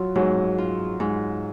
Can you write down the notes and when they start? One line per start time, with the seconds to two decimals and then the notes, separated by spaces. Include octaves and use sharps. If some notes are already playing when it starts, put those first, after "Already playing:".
Already playing: F#3 F4
0.15 G#2 F#3
0.58 F4
1.00 G#2